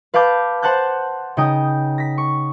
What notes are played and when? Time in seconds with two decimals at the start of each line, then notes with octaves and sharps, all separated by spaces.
0.14 B4 F5 A5 D6 G6
0.62 C5 F#5 A5 F#6 G6
1.37 C#3 D#4 G5 D#6 G6
1.98 A#6 B6
2.18 C#6